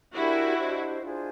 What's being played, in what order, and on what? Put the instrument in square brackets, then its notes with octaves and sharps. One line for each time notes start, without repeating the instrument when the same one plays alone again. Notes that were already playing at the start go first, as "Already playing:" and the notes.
[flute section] D4 G4 A#4 [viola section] E4 F#4
[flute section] D4 G4 C5 D#5
D4 F4 G#4 C5